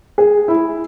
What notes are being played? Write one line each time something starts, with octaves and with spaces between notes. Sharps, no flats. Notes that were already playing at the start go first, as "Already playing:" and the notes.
G#4
E4